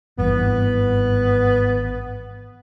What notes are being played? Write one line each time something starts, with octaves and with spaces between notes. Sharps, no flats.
G#1 G2 E3 B3